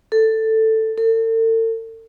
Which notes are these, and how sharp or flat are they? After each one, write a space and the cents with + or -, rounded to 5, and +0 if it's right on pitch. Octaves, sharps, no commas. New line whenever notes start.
A4 +10
A4 +40